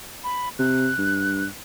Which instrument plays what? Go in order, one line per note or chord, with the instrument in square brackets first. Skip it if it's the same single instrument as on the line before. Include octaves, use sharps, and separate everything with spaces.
[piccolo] B5
[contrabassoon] C3 [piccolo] F#6
[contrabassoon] G2